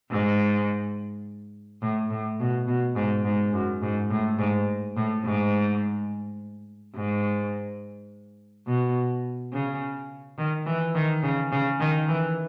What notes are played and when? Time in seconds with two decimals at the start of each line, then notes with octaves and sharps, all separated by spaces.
0.11 G#2
1.82 A2
2.11 A2
2.40 B2
2.68 B2
2.96 G#2
3.25 G#2
3.53 F#2
3.82 G#2
4.10 A2
4.39 G#2
4.96 A2
5.24 G#2
6.95 G#2
8.67 B2
9.53 C#3
10.38 D#3
10.66 E3
10.95 D#3
11.23 C#3
11.52 C#3
11.80 D#3
12.08 E3